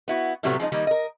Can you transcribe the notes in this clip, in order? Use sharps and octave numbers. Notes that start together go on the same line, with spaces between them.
B3 E4 F#4
A2 C3 F#3 G3 A3 B3
F3 G#3 C4 D#4
D#3 G3 A#3 D#4
A#4 D#5